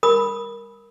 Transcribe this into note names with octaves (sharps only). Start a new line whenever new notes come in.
A#4 B5 D#6